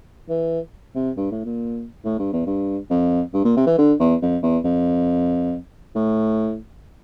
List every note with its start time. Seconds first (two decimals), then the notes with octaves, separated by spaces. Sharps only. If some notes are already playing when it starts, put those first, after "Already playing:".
0.29 E3
0.95 C3
1.17 G2
1.32 A2
1.45 A#2
2.04 A2
2.19 G2
2.33 E2
2.47 G2
2.90 F2
3.34 G2
3.45 A#2
3.57 C3
3.67 E3
3.78 D3
4.00 E2
4.22 F2
4.43 E2
4.65 F2
5.95 A2